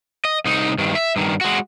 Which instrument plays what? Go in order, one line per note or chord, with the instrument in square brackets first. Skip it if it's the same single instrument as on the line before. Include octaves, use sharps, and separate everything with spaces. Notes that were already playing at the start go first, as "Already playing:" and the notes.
[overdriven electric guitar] D#5
C2 D#4
G2 D#3
E5
G2 D#3
G#3 F#4